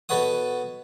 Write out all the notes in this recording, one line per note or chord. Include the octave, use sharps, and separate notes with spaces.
B2 A4 B4 C#5 F#5 D#6